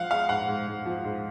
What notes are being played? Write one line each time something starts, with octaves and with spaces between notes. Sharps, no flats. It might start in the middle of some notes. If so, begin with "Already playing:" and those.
Already playing: F3 G#3 F5 F#5
G#3 F5
G#2 F#5
G#2
G#2
F3
G#2